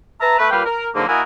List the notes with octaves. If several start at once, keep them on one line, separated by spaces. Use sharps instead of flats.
B4 E5 A5 A#5
A3 B4
A#2 G3 G4 B4 F5 G5
A#4
G#2 D3 F3 F#3 A#3
A#3 E4 F#4 A#4 D#5 G#5